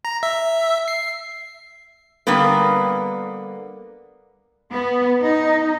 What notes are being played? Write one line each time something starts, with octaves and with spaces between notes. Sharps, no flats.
A#5
E5
C7
D3 G3 A#3 B3 B4
B3
D#4